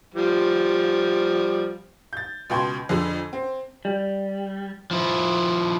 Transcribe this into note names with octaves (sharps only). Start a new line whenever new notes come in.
F3 G3
G6 A6
C#2 B2 G5 C6 G#6
F2 D3 G#4
C4
G3
F3 E4